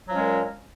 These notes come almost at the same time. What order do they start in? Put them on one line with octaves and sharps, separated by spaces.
F#3 F3 C#4 G#3 A#2